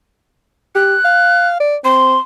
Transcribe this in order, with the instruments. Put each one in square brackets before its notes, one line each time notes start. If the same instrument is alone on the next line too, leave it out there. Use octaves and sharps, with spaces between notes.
[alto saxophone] G4 [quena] F#6
[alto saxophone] F5
D5
[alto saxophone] C4 [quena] C6